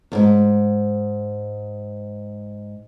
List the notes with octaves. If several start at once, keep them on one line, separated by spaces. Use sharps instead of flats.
E2 G#2